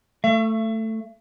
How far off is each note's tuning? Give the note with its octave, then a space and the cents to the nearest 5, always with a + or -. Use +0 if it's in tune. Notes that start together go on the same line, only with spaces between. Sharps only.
A3 +10 E5 +40